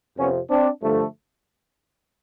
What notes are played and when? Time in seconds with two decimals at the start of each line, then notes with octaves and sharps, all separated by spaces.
0.17 F2 C3 F3 B3 C#4
0.49 C4 D4
0.82 G2 D3 F3 A3